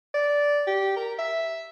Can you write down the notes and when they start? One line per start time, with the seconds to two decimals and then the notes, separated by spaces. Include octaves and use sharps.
0.14 D5
0.67 G4
0.96 A#4
1.19 E5